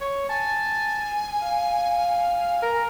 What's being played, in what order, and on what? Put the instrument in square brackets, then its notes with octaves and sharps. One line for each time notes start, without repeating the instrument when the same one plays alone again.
[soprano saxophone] C#5
[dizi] G#5 [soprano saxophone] A5
[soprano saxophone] F5
A#4